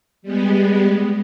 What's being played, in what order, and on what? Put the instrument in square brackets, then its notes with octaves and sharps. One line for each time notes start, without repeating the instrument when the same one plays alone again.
[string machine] G3 G#3 B3